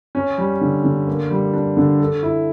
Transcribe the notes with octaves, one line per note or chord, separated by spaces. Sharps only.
C#4
G3
D3
D3
A#3
G3
D4
D3
A4
E4